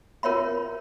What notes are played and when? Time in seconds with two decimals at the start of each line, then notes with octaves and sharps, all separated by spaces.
0.23 F4 A#4 C#5 E5 B5